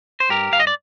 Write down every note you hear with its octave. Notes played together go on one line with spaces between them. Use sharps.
C5
G2 G4 A#4
G2 F5
D#5
D5